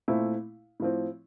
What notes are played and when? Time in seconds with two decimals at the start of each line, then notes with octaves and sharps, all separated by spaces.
0.08 A#2 A3 C4 E4
0.80 A2 F3 C4